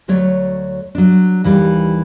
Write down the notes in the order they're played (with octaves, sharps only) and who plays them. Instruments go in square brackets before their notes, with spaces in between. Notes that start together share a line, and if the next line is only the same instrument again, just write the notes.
[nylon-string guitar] D2 F#3 A3 C#5 D5
F#3 D4
D#2 E3 G3